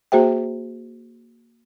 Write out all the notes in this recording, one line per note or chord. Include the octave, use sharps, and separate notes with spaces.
A#3 F#4 G#4 C5 E5 G5